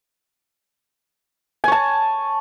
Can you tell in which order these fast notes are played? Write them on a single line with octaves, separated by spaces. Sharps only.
G#5 C#5 A5